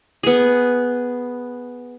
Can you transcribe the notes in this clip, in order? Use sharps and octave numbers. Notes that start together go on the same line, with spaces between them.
B3 G#4